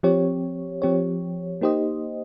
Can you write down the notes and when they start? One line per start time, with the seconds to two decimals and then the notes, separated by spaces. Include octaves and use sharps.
0.03 F3 C4 G4 C#5
0.82 F3 C4 G4 C#5
1.61 A#3 D#4 G4 C5 D#5